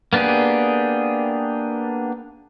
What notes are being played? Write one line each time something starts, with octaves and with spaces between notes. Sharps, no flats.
A#3 B3 D4 G4 G#4